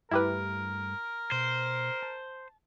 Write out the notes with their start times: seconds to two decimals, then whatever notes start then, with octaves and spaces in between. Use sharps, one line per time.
0.11 G2 A3 E4 G4 A#4 B4
1.32 B2 C5
2.02 A5